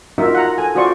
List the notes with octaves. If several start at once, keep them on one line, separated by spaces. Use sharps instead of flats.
D#4 F4 F#4 A#4 E5
F#5 A#5
A4 G#5
F4 F#4 C5 D5 C#6